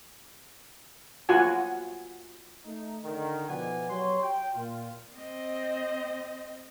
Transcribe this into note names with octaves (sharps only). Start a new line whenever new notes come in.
F4 F#4 F#5 G#5
A3 D#4
D3 D#3
B2 F3 B4 D5 F#5 G#5
F#3 G4 C#5 C6
G5
A#2 F4
C4 D#5